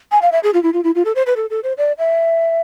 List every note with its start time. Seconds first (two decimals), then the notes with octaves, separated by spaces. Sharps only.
0.12 G#5
0.22 F5
0.32 E5
0.43 G#4
0.54 F4
0.63 E4
0.73 F4
0.84 E4
0.95 F4
1.05 A4
1.15 C5
1.26 B4
1.36 A4
1.50 A4
1.63 C5
1.78 D5
1.98 E5